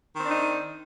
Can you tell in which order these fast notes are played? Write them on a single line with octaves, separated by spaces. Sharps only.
D#3 C4 D4 D#4